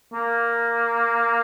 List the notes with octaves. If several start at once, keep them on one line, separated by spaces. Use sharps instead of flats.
A#3